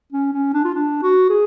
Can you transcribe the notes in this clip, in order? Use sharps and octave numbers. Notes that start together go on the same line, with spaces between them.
C#4
C#4
D4
F4
D4
F#4
G#4